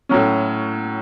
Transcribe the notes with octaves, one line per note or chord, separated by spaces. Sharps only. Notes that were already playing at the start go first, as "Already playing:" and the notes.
A2 F#3 C#4